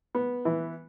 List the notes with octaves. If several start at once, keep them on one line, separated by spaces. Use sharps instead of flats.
B3
E3